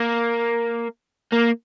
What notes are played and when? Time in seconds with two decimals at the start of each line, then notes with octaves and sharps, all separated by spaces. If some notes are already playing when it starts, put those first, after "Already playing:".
Already playing: A#3
1.33 A#3